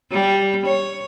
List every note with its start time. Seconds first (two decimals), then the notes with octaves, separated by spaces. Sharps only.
0.12 G3
0.66 C#5